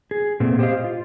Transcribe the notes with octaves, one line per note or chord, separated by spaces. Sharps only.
G#4
A#2 A3 B3 C4
G4 C5 C#5 D#5 F5
F4